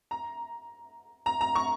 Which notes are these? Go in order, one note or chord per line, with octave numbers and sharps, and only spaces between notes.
A#5
A#5
A#5
C#6